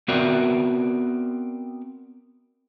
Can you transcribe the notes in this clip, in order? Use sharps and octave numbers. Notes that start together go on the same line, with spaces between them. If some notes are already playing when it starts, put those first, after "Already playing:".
B3 C4 F#4 A#4 D5 E5